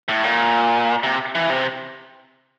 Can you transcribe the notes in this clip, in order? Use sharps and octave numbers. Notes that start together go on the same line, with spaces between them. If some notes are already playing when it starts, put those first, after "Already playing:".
A2
A#2
C3
E3
C3